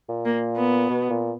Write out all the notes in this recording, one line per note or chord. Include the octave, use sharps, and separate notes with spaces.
A#2
A#3
B3
B2
A#2